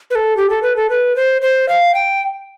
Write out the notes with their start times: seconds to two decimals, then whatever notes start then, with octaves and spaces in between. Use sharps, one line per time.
0.10 B4
0.15 A4
0.37 G4
0.50 A4
0.63 B4
0.76 A4
0.90 B4
1.16 C5
1.42 C5
1.69 F5
1.94 G5